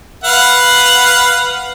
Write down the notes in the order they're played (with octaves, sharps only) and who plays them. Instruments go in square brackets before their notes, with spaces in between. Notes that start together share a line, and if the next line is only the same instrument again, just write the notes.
[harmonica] B4 F5 F#5